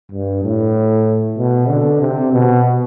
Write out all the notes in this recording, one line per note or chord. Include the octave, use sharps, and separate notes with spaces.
G2
A2
B2
D3
C3
B2